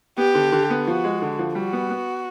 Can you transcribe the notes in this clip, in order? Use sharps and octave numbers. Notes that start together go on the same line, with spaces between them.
B3 G4
D3
D3
B3
F3 F#4
G#3
D3
F3
G3 F#4
B3
B3